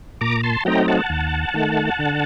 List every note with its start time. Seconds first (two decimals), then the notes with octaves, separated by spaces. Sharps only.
0.21 A#2 A#5 D6
0.43 A5 C6
0.65 F#3 A3 C4 D#4 G5 A#5
0.88 F#5 A5
1.10 D#2
1.54 D#3 A3
1.99 D3